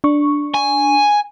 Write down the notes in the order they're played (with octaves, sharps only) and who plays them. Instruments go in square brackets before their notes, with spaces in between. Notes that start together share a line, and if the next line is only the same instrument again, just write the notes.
[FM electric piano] D4 C#6
[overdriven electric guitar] G#5